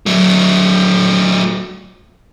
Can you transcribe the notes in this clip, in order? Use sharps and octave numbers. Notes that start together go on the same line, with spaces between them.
F#3 A3